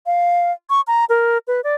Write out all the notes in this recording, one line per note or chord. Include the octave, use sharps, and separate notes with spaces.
F5
C#6
A#5
A#4
B4
D5